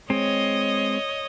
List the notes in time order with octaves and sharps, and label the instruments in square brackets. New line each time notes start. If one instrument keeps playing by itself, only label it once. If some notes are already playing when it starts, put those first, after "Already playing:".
[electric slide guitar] G#3 C4 [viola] C#5 D#5